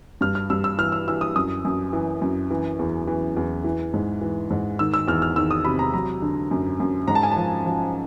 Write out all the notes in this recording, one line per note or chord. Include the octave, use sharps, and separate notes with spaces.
G2 F6
F6
G2 E6
E6
E3 F6
E6
E3 E6
D#6
F#2 D#6
F#2
E3
F#2
E3
E2
E3
E2
E3
G#2
E3
G#2
D#3 E6
E6
E2 F6
F6
D#3 E6
D#6
C3 B5
A#5
F#3 A#5
D3
F#2
F#2
G#2 A#5
A5
G#5
F3 A5
F3